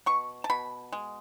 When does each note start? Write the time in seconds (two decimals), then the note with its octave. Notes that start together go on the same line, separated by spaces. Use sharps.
0.06 B2 C#6
0.44 A5
0.50 B2 B5
0.92 G#3